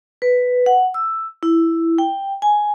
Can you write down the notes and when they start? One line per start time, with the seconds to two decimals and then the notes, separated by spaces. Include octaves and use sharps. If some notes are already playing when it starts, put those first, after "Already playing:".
0.22 B4
0.66 F#5
0.94 E6
1.43 E4
1.98 G5
2.42 G#5